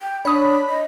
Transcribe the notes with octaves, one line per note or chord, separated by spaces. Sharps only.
G5
D4 C#5 B5 D#6
D#5